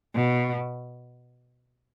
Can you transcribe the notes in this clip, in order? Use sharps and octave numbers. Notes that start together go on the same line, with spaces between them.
B2